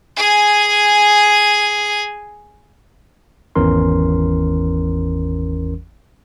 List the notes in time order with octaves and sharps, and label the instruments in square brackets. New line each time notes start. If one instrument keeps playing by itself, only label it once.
[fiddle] G#4 G#5
[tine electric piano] G#1 E2 E3 C#4 A#4 C6